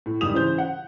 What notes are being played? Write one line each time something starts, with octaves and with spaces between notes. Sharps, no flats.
A2
F#1 G#2 G3 G4 D#6 F7
C#3 E3 C5 G6
F#5